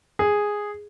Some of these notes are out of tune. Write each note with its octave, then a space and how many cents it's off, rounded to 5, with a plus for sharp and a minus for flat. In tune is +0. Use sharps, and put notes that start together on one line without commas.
G#4 -5